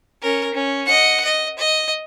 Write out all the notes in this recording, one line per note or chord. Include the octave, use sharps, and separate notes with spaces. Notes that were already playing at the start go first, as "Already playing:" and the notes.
C#4 A#4
C#4
D#5 F#5
D#5
D#5